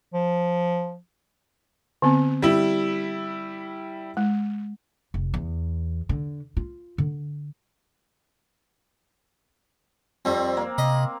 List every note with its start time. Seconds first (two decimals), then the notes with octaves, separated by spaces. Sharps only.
0.13 F3
2.02 D3 B3 C4
2.42 G3 E4
4.17 G#3
5.14 F1
5.34 E2
6.09 D3
6.57 F4
6.98 D3
10.25 F2 G3 C4
10.57 A#3
10.78 C3 D#5 B5